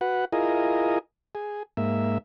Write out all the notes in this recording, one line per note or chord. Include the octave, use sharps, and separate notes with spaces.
F#4 B4 F#5
E4 F4 G#4 A#4 D#5
G#4
G#2 A#3 E5